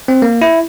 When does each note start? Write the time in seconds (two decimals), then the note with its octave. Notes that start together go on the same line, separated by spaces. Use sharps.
0.08 C4
0.22 A#3
0.41 E4